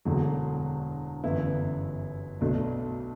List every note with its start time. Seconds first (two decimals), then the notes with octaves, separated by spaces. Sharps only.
0.05 E1 E2 D3 F#3
1.24 G1 F#2 E3 B3 E4
2.41 B1 B2 A3 D4